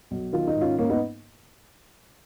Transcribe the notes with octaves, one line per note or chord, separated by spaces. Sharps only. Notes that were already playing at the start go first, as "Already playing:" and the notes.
B1
D#3 F4
D#4
G#2
C#4 F4
G#2 A#3 C#4
B3 D#4